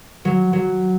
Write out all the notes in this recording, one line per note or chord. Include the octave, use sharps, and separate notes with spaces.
F#3
F#3